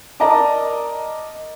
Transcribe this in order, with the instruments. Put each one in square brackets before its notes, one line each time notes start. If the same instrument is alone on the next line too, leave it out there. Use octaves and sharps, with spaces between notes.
[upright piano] A#4 D5 D#5 A5 A#5 D6